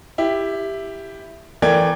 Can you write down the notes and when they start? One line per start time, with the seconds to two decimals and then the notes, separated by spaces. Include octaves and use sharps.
0.18 E4 G4
1.62 E3 A3 A#4 D5 G5 G#6